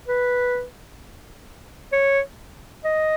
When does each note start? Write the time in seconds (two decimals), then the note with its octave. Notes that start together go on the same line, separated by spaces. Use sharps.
0.08 B4
1.92 C#5
2.84 D#5